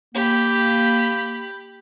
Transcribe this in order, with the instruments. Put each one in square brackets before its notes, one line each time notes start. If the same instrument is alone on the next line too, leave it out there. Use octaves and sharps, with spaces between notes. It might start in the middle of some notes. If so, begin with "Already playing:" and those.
[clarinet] A#3 [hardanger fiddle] G4 B5